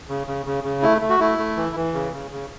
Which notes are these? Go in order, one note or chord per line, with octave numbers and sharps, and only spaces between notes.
C#3
C#3
C#3
C#3
A3 E4
A3
F#4
A3 E4
A3
E3
E3
C#3
C#3
C#3